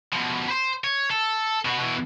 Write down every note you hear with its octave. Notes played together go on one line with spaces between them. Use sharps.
B2 F3
B4 C5
C#5
A4
B2 F#4
B2 E3